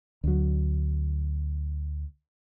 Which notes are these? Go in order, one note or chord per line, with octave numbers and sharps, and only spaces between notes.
D2 F#3